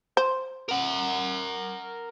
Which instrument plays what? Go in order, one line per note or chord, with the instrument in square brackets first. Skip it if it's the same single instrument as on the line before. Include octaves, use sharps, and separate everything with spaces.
[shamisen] C5
[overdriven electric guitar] A#4 F#5